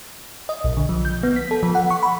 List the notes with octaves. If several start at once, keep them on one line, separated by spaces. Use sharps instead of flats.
D#5
B1
D3
F3
G6
B3
B6
A4
F3
F#5
C#6
B5